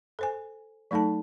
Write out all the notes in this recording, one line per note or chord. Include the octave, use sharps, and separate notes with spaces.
A4 C5 G#5
F#3 A3 D#4 A4 A5